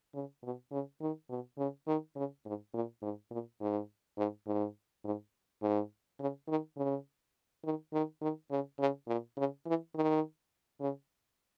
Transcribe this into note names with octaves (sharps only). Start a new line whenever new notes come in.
C#3
B2
C#3
D#3
B2
C#3
D#3
C#3
G#2
A#2
G#2
A#2
G#2
G#2
G#2
G#2
G#2
C#3
D#3
C#3
D#3
D#3
D#3
C#3
C#3
A#2
C#3
E3
D#3
C#3